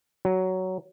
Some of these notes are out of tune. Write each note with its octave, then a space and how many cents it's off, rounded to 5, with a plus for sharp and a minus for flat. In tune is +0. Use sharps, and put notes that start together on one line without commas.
F#3 +10